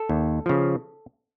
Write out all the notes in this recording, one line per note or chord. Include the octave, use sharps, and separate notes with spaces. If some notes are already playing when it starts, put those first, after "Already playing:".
Already playing: A4
D#2
C#3 F3